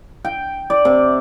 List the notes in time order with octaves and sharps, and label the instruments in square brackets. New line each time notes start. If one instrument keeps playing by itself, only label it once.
[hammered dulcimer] G5
D5
C3